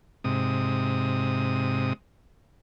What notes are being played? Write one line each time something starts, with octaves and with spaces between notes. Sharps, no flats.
G#2 C3 D#6